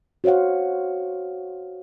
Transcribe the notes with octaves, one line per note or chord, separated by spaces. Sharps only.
F#4 C5 C#5 F5 F#5